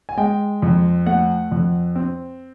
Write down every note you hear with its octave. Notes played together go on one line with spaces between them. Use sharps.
G#5
G#3 G5
F2
A3 F#5
F2
C4